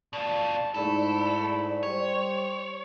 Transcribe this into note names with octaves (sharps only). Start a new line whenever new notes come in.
B2 F4 D5 A5
G#2 A3 E4 A4
G3 G4 C5 C#5